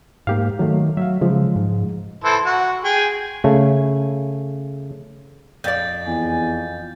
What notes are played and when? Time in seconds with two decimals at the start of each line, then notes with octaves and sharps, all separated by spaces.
0.27 G#2 A#3 G4 F5
0.59 D#3 F#3 A3
0.97 F#3 E5 F5
1.21 C#3 F3 G#3
1.56 G#2
2.24 E3 A4 C5
2.45 F#4
2.85 G#4 G5
3.44 C#3 A3
5.64 F2 D5 G6 A6
6.07 E2 G#5